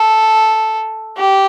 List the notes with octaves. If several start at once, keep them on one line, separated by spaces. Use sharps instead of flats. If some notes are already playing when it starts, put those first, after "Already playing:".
Already playing: A4
G4